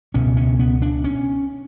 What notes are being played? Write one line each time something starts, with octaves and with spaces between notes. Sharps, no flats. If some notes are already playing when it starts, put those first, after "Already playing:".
C#2 B2 C#4
C#4
B3
D4
C#4